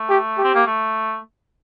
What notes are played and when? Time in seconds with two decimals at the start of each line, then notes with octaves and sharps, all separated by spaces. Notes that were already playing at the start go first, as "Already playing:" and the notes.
Already playing: A3
0.09 G4
0.38 G4
0.44 C4
0.55 A#3
0.67 A3